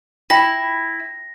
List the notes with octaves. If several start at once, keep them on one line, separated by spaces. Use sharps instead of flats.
E4 F4 G5 A#6